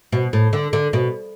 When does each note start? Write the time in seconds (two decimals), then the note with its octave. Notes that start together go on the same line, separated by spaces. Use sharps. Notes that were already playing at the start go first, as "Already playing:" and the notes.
0.12 B2
0.33 A2
0.53 D3
0.73 D3
0.93 B2